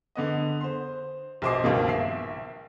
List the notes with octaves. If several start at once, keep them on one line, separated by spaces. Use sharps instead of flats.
D3 B3 D#5
C5 C6
A#1 B2 C5 D#5 D6 C7
C#2 G2 B2 D#3 A#3
A#1 E5 C7